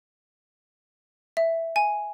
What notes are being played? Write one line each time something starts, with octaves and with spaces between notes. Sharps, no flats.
E5
G#5